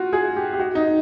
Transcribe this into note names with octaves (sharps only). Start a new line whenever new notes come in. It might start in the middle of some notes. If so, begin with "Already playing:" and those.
Already playing: F4 F#4
G#4
G4
G4
F#4
D#4